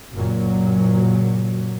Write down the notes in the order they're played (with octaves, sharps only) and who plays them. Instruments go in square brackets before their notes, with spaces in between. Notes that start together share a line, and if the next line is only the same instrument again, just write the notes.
[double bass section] F#1 A#2 F#3